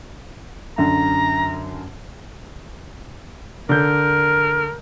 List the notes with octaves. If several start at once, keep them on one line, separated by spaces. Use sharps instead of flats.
F#2 D3 A#5
D3 A#4 G6